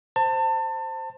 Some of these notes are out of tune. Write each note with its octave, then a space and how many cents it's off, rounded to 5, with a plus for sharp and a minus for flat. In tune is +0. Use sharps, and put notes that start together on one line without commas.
C5 +0 A5 +30